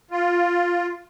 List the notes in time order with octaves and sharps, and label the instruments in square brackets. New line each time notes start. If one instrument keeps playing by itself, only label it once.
[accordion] F4